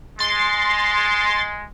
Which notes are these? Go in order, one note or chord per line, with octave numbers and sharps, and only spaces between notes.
G#3 C6 A6